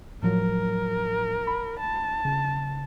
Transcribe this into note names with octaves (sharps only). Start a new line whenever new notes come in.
A2 F3 F#3 A#4
B5
A5
C#3